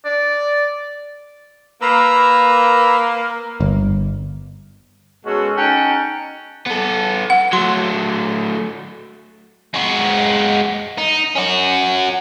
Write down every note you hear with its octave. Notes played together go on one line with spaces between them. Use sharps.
D5
A#3 B4 A#5 E6
G1
B2 G#3 C#4 F#4 A4
C#4 D#4 F#5 G5 A5
B3 A4
F#5
F#3 A3 C6
G#3 F#4
D#4
C#4 F#4